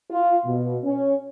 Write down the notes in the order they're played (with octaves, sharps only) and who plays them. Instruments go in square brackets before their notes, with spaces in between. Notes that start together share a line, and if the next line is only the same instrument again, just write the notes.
[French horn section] F4
B2
C#4